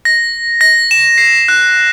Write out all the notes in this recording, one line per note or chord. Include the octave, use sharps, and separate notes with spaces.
A#6
A#6
E7
C7
F#6